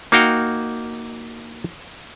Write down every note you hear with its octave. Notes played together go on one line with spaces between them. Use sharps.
A#3 D#4 F#4 F5 G5